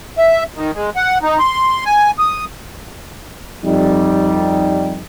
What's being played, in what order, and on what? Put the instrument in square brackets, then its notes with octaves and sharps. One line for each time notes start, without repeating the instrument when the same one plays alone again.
[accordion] E5
D#3
G#3
F#5
D#4
C6
G#5
D#6
[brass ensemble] F2 G3 D#4